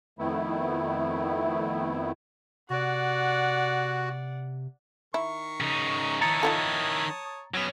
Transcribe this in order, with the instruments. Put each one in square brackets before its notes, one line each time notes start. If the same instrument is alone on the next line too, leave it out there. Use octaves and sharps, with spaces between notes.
[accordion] F2 D#3 A3 B3 E4
[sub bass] C3 [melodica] F#4 [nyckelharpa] D5 F#5
[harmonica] D#3 A#4 C#6 [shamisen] E4
[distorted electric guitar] C#3 D#4
[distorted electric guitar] D#3 E4 [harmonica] C#5 A5 D#6 [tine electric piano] A#5 A6 C#7
[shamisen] D#4 F4 A4
[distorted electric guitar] F#3 B3 [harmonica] C#4